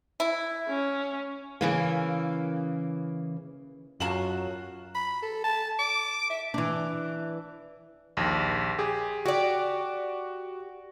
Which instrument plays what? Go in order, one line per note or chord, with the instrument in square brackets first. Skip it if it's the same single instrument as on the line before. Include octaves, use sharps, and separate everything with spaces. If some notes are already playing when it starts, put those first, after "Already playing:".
[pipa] E4
[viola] C#4
[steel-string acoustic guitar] C#3 E3 A#3
[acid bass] F#2 [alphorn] F#3 [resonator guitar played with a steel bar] F4 F#4 A5 [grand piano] A#5 E7 F#7
[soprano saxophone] B5
A4
A5
D6
E5
[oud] E3 D4
[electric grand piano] A#1 D#2
G4 G#4
[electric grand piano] F#4 [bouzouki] G4 D5